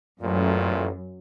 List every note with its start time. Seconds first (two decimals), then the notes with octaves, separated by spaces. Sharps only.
0.21 A1 F#2 A#2 A3